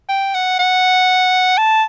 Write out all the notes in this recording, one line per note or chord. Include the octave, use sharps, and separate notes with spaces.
G5
F#5
F#5
A5